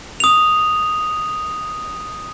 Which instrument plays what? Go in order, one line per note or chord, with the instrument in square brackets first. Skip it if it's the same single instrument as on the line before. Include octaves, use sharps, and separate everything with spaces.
[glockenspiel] D#6 F7